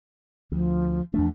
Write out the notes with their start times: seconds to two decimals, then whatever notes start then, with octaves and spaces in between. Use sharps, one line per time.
0.52 D2 F3
1.14 E2 F3 A3 D4